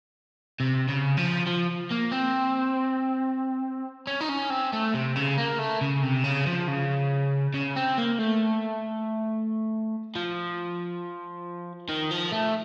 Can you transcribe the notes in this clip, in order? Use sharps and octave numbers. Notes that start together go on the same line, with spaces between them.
C3
C#3
F3
F3
A#3
C4
C#4
D#4
C#4
C4
A3
C3
C#3
A#3
A3
C#3
C3
C#3
F3
C#3
C#3
C4
A#3
A3
F3
D#3
F3
A3